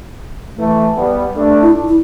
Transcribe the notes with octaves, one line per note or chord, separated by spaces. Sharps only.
E3 A3
G3 B3
A3 D4
E4
E4